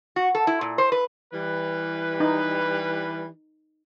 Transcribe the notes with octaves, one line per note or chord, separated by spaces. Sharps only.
F#4
A4
E4
A#2
C5
B4
E3 G3 B4
D#4